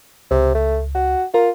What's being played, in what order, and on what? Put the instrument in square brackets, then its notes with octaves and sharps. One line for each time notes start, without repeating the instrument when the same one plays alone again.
[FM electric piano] C#2 [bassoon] C3
[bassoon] A3
F#4
[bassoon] F4 [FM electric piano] A#4